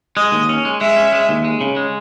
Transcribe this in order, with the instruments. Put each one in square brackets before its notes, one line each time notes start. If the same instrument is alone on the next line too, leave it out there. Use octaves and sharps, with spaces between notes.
[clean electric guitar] G#3 [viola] D#5
[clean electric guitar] D#2
C#4
G#3
[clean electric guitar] G#3 [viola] E5
[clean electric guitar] C#4
G#3
D#2
G#3
C#3
G#3